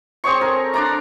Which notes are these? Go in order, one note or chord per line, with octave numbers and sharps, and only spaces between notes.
C4 G#4 C#5 C#6
A4 A#4
D4 D5 A#5